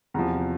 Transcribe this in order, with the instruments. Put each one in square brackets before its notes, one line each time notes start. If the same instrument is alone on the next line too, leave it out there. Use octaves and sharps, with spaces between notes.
[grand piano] E2 C3 F3 A#5